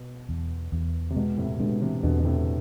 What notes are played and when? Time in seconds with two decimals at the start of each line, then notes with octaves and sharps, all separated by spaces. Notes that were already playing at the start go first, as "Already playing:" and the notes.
Already playing: B2
0.29 E2
0.72 E2
1.10 C3
1.16 B2 G#3
1.37 A2 C3
1.56 C3
1.60 B2 D3 G#3
1.82 C3 E3
2.03 E2 B2 D3
2.19 B2
2.25 A2 C3